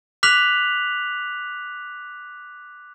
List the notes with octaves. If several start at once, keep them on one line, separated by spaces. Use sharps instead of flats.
D6 F6 F#6 B6 F7 F#7